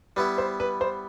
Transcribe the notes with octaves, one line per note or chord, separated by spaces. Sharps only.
G3 B3 E4 B4
C5
B4
C5